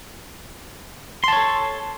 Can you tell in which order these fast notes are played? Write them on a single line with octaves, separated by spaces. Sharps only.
C6 A5 C#5 A4